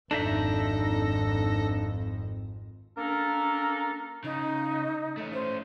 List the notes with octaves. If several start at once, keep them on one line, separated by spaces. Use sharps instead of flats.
G#1 F2 D4 D#4 A4 E5 A#6
A#3 C#4 D4 A4 A#4 A#5
C#3 D#4
A3 C#4
C5